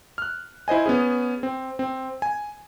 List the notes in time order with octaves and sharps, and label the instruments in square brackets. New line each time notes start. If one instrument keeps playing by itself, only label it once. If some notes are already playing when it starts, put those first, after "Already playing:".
[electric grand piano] F6 F#6
E4 C5 D#5 G#5
B3 C#4 G#4
C4
C4
G#5